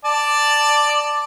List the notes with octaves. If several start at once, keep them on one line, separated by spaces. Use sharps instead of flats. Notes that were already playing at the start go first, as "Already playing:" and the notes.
D5 A5